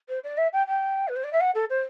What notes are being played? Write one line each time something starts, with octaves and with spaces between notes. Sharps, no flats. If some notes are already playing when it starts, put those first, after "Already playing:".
C5
D5
E5
G5
G5
B4
C5
D5
E5
F#5
A4
C5